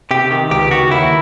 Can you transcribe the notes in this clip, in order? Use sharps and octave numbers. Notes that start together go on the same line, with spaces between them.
C3 G4
D#3
C#2 G4
D#3 F#4
D#2 E4